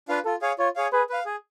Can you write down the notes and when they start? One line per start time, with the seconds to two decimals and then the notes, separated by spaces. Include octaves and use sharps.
0.09 D4 F4 B4 F5
0.25 F4 A4
0.42 G#4 C#5 F5
0.59 F4 C#5
0.76 G#4 C#5 F5
0.93 G#4 B4
1.09 B4 F5
1.26 G#4